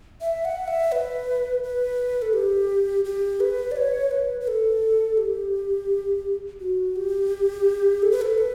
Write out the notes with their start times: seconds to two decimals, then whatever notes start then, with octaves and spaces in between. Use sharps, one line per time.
0.21 E5
0.45 F#5
0.68 E5
0.92 B4
1.63 B4
2.22 A4
2.33 G4
3.05 G4
3.40 B4
3.72 D5
3.76 C#5
4.11 B4
4.40 B4
4.48 A4
5.18 G4
6.60 F#4
6.96 G4
8.02 A4
8.11 B4
8.21 A4
8.38 B4